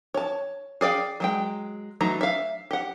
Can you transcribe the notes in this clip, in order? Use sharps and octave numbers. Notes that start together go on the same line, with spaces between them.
C#5 A5
G#4 D5 F5 G5
F#3 G#3 G5
E3 F#3 A3 D#4 A#5
E5 F5
G4 F#5